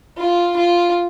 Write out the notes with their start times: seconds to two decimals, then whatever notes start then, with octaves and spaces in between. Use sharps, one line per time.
0.18 F4
0.56 F4